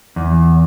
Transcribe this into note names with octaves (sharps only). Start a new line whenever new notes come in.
E2